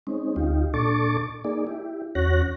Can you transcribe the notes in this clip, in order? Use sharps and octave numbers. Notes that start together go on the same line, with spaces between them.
G#3 C4 C#4 D#4
D2 D#4 F4 G4
A#2 D4 A4 C#6 D6 A6
A#3 D#4 G#4 D5
E4 G4
E2 C#4 F#4 C#5 F#6 A#6